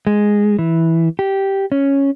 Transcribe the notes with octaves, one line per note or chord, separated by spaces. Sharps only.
G#3
E3
G4
C#4